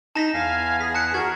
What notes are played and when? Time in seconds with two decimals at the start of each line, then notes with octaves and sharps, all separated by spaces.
0.16 D#4 A5 A#6 B6
0.34 E2 F5 G#5
0.81 G#4 B6
0.95 A5 F#6 C#7
1.14 F#4 A#4 G#6